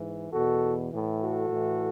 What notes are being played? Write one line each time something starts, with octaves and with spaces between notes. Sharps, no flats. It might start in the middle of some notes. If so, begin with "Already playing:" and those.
Already playing: G#2 E3
E2 B2 F#4 A4
A2 E3
F#4 A4
A2 E3